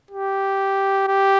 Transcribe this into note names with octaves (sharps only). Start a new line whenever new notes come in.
G4
G4